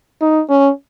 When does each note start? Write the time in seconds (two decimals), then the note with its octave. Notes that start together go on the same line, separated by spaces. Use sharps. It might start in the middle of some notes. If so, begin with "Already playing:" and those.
0.21 D#4
0.49 C#4